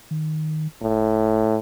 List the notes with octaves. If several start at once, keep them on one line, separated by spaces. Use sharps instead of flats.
D#3
F1 A2